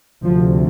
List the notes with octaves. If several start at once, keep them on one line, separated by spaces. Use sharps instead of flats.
D2 C3 F3